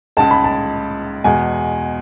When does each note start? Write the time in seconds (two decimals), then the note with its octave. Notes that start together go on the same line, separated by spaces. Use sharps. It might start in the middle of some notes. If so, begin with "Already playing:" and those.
0.17 C#2 C#3 G#3 A5
0.31 B5
0.44 A5
1.24 E2 B2 G#3 G#5